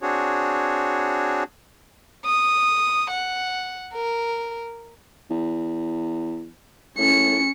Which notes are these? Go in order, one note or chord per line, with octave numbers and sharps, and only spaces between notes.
C4 D4 F#4 G#4 C#5
D#6
F#5
A#4
E2
A2 C#4 C#7